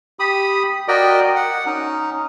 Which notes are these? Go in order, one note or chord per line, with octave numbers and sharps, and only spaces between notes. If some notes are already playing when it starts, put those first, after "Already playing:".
G4 B5 D#6
F#4 A#4 D5 D#5 G5
F#5
C#4 D#4